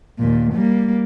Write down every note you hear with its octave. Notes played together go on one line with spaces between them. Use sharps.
D#2 A#2
G3 A#3